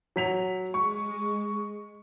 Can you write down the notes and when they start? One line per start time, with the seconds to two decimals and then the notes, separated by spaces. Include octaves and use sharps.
0.16 F#3 B6 F7
0.74 G#3 C#6